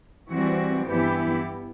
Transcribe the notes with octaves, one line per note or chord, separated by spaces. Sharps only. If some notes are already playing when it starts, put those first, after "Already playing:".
E3 G3 C4 F#4
G2 E3 B3 E4 G4